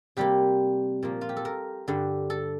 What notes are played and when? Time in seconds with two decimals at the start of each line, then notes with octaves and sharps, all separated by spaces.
0.17 C3 G3 A#3 G4
1.03 A#2 F3 A#3
1.21 F4
1.29 G4
1.37 A4
1.45 A#4
1.88 G2 D3 G3
2.30 A4